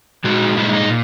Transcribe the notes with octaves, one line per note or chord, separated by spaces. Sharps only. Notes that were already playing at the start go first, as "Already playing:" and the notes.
A#2 G#3 D#4 F#4
A#2 G#3 D#4 E4
D#4
A#2